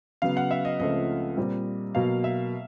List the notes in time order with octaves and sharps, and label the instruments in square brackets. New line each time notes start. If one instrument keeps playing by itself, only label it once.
[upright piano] C#3 F#3 B3 [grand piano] F5
[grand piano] F#5
E5
D#5
[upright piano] C#2 C#3 F3 A3 C4 [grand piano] D#5
[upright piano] A#2 G3 C4
[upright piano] B2 F#3 A#3 [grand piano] F5
[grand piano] E5